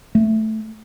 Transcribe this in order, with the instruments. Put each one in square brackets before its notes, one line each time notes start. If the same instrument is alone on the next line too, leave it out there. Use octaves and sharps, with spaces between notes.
[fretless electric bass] A3